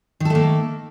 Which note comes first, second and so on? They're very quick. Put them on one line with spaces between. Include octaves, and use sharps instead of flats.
D#3 A4 A3 A#3